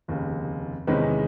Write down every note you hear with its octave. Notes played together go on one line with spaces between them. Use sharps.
F1 D#2 C#3
E2 C3 D#3 G#3 C#4 B4